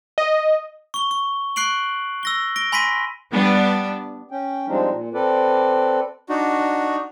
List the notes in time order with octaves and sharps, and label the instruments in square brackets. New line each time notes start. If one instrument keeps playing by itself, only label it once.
[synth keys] D#5
[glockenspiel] C#6 G7
C#6
C#6 F#6 C7 D7 F#7
E6 A#6 G7
A#6 D7 G7
G#5 B5 C6 A#6 B6 D#7
[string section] G3 B3 D4
[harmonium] C#4 G5
F3 G3 G#3 C4 D4 D#4
A#2
C4 A4 B4 D5
[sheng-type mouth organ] D4 D#4 F#4